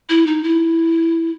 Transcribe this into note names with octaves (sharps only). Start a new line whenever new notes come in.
E4
D#4
E4